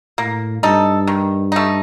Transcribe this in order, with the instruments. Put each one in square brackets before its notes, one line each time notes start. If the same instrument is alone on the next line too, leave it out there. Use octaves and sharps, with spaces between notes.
[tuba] A2 [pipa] A#3
[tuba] G2 [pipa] D#4 A4
[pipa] D#3
A3 D#4